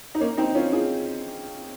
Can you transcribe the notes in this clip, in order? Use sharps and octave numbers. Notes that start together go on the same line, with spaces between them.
D#4
A#3 C#4
C4 D#4
C#4 F4
F4 G#4